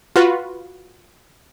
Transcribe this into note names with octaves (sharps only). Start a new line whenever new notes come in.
F4 F#4 B4